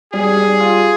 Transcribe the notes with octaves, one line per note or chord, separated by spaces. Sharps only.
G3 G#4
G3
F4